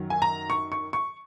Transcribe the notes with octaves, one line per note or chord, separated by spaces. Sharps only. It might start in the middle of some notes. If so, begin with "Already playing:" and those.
Already playing: F#2 D#3 F#3
G#5
A#5
C#6
C#6
C#6